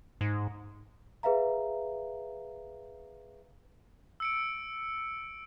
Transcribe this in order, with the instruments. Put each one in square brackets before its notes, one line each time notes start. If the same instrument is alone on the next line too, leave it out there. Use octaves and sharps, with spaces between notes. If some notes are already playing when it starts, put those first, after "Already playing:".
[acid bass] G#2
[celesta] G#4 B4 E5 F5 A#5
[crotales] E6 C#7 D7